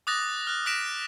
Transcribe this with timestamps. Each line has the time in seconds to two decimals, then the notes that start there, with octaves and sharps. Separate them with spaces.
0.07 D6 D#6 F#6 A6 A#6
0.47 F6 F#6
0.66 D#6 F#6 A#6 B6 D7 E7